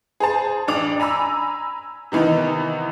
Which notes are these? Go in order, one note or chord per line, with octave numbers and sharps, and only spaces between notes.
G#4 C5 A5
A1 D4 D6 F7
G#5 A#5 B5 E6
C3 D#3 E3 B3 D#4